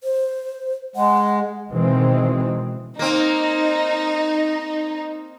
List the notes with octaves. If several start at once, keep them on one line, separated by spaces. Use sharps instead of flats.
C5
G#3 F#5
B2 D#3 E3 G#3 C4
A#3 C4 D#4